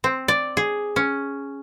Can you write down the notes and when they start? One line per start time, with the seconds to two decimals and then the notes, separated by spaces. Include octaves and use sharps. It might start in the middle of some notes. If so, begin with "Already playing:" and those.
0.04 C4
0.28 D5
0.57 G#4
0.96 C#4